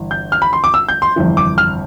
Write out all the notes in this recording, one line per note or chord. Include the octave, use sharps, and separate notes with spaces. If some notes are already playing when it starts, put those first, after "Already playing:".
Already playing: G1 E3
G6
F6
B5
C6
D6
E6
G6
C6
G1 F2 E3
D6
F6